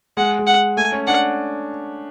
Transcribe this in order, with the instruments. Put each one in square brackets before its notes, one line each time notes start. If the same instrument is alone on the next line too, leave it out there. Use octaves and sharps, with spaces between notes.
[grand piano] G#3 [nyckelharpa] F#5
[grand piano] G#3
[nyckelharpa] F#5
[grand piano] A3 [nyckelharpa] G#5
[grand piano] C#4
[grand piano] D4 [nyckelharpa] F#5